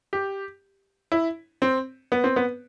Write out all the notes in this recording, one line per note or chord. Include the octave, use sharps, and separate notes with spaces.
G4
E4
C4
B3
C4
B3